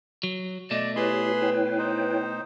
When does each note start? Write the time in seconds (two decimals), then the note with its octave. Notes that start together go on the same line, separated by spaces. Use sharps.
0.23 F#3
0.71 B2 A3 D5 D#5
0.96 E4 G4 G#4 B4 C#5 B5 C6
1.42 E4 C#5 G5
1.78 D#4 C5